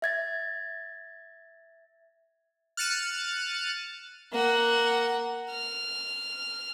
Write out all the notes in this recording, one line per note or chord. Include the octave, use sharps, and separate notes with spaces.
E5 G#6 A6
F6 F#6 A6 C#7 D#7 E7
A#3 F#5
F6